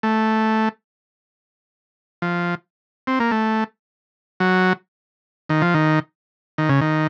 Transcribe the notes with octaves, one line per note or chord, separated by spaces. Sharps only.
A3
F3
C4
A#3
A3
F#3
D#3
F3
D#3
D#3
C#3
D#3